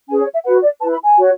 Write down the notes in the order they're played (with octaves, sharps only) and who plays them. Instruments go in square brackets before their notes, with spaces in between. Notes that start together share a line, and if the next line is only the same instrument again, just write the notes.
[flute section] C#4 G#4 B4 G#5
C#5
E5
F#4 B4 F#5
D5
E4 B4 A5
B5
G#5
F#4 C#5